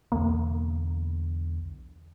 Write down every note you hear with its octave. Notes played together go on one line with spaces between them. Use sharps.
B1 E2 D3 A#3